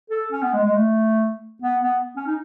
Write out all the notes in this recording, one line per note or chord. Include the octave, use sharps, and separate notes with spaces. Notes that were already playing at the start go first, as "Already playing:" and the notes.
A4
C#4
B3
G#3
G#3
A3
B3
B3
C#4
D#4